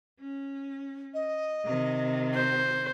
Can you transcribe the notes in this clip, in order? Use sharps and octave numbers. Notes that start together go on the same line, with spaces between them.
C#4
D#5
C3 D#3
C5